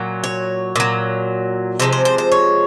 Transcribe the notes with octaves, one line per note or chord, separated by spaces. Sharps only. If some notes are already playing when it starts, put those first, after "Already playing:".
Already playing: A#2 F#3
C#5
A#2 F#3
C3 F3 G#3 C5
C5
C5
C5
C#5